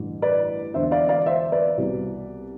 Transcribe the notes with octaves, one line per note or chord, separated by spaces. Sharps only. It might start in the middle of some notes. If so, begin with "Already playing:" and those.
Already playing: A1 G2 D3
B4 D5
E1 E2 D3 C5 E5
D5 F5
D5 F5
C5 E5
B4 D5
C2 B2